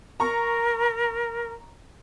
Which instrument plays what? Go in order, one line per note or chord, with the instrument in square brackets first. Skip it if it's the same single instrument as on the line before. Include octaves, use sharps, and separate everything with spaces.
[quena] A#4 [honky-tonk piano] A#5 C#6